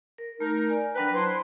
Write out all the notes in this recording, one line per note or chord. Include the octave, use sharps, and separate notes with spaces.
A#4
A3 D#4 A#4
D5 G#5 A#5
F#3 D4 B4 G5
E4 C5 A5 A#5 C6